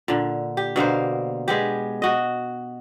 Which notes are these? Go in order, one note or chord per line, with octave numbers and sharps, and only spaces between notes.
A#2 D3
G4
B2 D3 A#3 C5
G#3 B3 G4
F#4 D#5